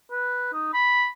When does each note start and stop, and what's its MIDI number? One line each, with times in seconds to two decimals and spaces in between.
0.11 0.53 71
0.53 0.71 63
0.74 1.07 83